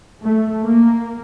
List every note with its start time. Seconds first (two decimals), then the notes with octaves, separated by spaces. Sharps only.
0.22 A3
0.63 A#3